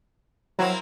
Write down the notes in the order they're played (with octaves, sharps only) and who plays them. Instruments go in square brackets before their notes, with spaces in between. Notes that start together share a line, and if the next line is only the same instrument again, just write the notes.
[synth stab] F#3 [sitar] A#3 C4 E4